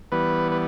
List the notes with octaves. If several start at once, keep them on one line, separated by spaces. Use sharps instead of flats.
E3 G3 B3 B4
B4